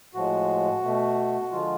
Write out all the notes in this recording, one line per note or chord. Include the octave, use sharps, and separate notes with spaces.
A2 F3 G#3 F#4
B2 A3
D3 F3 G#3 F4